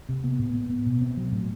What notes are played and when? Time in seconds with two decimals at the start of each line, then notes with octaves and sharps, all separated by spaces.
0.09 C3
0.24 B3
0.39 A2
0.54 B3
0.70 B3
0.86 B2
1.01 C4
1.17 F#3
1.32 A2